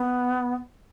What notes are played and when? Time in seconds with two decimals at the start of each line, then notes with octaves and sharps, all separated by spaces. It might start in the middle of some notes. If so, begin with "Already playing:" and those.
Already playing: B3